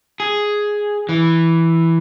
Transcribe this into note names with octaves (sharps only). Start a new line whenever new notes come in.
G#4
E3